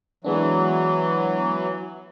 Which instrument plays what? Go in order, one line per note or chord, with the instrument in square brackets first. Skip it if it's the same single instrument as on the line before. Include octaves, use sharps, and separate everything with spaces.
[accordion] E3 F#3 [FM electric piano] G#3 B3 D4